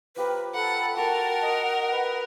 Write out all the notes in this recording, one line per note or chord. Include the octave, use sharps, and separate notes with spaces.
F3 G4 A#4 B4
A4 F#5 A#5 B5
F#4 A#4 F#5 G5 A5
D#5
B4